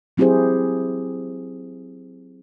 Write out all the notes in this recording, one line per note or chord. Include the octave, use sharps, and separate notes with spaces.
F#3 C4 E4 G4 G#4 C5